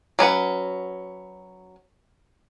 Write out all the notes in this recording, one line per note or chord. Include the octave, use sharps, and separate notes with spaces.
F#3 C#4 B4 F#5